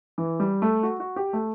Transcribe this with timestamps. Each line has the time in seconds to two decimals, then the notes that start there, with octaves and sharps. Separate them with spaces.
0.18 E3
0.40 G3
0.62 A3
0.83 F#4
1.00 F#4
1.16 G4
1.33 A3